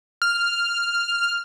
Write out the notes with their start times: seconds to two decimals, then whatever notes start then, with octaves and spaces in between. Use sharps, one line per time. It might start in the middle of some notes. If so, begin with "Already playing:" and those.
0.22 F6